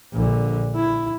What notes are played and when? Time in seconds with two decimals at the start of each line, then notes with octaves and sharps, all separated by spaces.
0.13 A#1 D3
0.76 E4